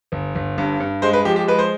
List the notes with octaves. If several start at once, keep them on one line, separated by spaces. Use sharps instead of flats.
G1
G1
G2
G2
G#3 C5
B4
F3 G4
G4
G#3 B4
C5